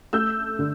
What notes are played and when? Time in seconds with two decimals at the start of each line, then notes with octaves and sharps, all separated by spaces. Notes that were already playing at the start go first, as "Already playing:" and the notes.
0.13 A3 E6 G6
0.59 D3